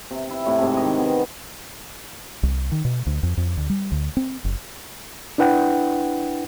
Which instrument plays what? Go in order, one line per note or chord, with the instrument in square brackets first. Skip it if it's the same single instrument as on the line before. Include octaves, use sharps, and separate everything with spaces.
[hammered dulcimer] C3
E4
A2 C3 E4
G#2 C3 G#4
D#3 G4 D#5
B3 G#4
[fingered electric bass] C2
D#3
B2
D2
F2
F2
D2
G3
D2
C4
F#1
[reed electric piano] D4 E4 B4 F#5 G5